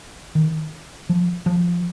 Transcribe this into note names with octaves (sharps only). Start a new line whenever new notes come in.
D#3
F3
F3